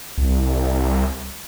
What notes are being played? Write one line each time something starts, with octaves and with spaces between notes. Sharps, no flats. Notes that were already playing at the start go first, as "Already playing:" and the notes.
C2